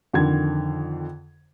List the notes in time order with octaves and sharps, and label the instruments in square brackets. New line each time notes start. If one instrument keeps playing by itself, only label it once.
[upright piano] F2 D3 D#3 G#6